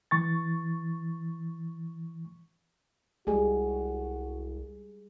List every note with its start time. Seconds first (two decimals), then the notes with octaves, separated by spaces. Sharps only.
0.11 E3 C#6 A6
3.27 C2 G3 G#3 F#4 G#4